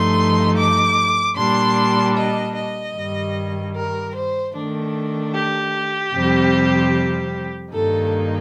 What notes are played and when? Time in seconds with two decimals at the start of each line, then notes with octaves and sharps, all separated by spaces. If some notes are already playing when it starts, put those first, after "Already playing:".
Already playing: G2 F3 A3 D#4 C6
0.58 D6
1.37 A#2 G3 D4 C6
2.17 D#5
2.56 D#5
2.95 G2 D#3 G3
3.76 A#4
4.15 C5
4.54 D#3 A3 D4
5.34 G4
6.13 F2 C3 G3 C4
7.73 G2 D#3 A#3 D#4 A4